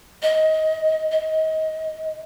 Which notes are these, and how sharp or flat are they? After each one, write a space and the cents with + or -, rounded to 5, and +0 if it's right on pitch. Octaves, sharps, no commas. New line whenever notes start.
D#5 +20
D#5 +25